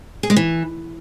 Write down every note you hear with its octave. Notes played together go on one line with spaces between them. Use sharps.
G#4
G#3
E3